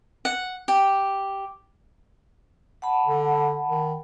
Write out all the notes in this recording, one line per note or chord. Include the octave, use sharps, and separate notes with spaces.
F#5
G4
F#5 A5 B5
D3
D#3